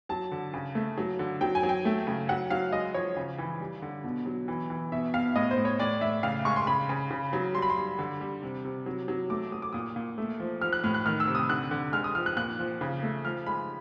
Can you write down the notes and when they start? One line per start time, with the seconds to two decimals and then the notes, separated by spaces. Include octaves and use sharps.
0.09 F#3 A5
0.32 D3
0.54 C#3
0.75 A3
0.98 F#3
1.19 D3
1.41 F#3 G5
1.55 G#5
1.63 F#3
1.69 G5
1.85 A3
2.07 C#3
2.29 F#3 F#5
2.50 F#3 F5
2.72 G#3 D#5
2.94 F3 C#5
3.17 C#3
3.38 E3
3.60 G3
3.82 D3
4.04 B2
4.26 F#3
4.48 E3
4.70 E3
4.92 B2 E5
5.14 B2 F5
5.36 A2 D#5
5.51 C5
5.58 A2
5.65 C#5
5.79 A2 D5
6.01 A2 E5
6.23 C#3 F5
6.45 G#3 C#6
6.56 C6
6.67 C#3 B5
6.89 C#3
7.11 C#3
7.33 F#3
7.55 G3 C6
7.62 B5
7.70 C6
7.77 G3
7.99 D3
8.21 G3
8.42 C3
8.65 C3
8.86 F#3
9.08 F#3
9.30 A3 D6
9.52 F#3 D#6
9.62 D6
9.73 A#2 D#6
9.96 A#2
10.18 A3
10.40 F3
10.61 F3 F6
10.73 F#6
10.84 A2 F6
10.94 F#6
11.05 D#3 F6
11.20 E6
11.27 C3
11.35 D#6
11.50 D3 F#6
11.71 D3
11.93 G#3 F6
12.04 D#6
12.15 F3 F6
12.26 F#6
12.37 A#2 F#6
12.59 F3
12.81 C#3
13.03 A3
13.25 F3 F6
13.46 G#3 B5